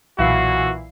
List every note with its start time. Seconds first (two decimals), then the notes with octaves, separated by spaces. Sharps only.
0.18 B1 A#2 E3 E4 F#4 F5 C7